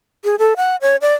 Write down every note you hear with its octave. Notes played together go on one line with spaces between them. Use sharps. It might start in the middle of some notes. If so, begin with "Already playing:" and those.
G#4
A4
F#5
C#5
D5